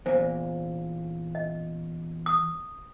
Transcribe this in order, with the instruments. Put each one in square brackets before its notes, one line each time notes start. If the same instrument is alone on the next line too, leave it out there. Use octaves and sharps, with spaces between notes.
[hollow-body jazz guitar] E2 A#2 [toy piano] C5
[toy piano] D#5
D#6